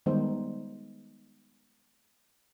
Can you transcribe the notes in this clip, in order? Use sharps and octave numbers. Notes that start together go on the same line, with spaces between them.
D#3 G3 G#3 B3 D#4 C5